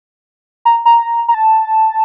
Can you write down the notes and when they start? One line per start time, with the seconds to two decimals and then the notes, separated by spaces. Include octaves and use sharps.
0.65 A#5
0.85 A#5
1.28 A#5
1.34 A5